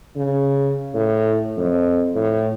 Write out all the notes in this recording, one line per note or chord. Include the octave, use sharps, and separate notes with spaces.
C#3
A2
F2
A2